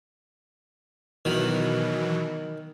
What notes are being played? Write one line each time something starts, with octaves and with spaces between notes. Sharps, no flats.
B2 D#3 E3 F#3